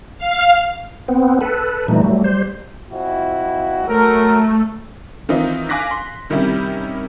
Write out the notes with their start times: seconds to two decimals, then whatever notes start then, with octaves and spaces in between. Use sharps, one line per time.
0.18 F5
1.08 B3 C4
1.41 A4 B4
1.88 A#2 E3 G3 A3 D#4
2.04 F#3 G3 A3
2.24 G3 C5
2.90 F2 E4 F#4
3.86 F#3 A3 A#4
5.29 D#3 E3 C4 D#4 F4
5.69 F5 G#5 D6 F#6 A#6 B6
5.91 C6
6.30 C3 D#3 G3 C#4 E4 G4